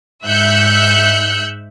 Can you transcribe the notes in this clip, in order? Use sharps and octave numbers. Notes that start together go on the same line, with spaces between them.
G#2 E5 E6 F#6 G6 C#7